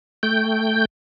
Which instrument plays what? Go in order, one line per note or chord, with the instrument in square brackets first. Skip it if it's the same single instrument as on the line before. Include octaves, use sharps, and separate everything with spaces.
[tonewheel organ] A3 G5 G6